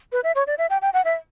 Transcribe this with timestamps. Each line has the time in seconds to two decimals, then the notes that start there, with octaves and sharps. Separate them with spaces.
0.12 B4
0.24 E5
0.35 C#5
0.47 D5
0.58 E5
0.70 G5
0.82 G5
0.93 F#5
1.05 E5